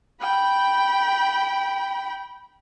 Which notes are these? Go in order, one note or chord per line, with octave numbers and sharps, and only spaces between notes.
G5 B5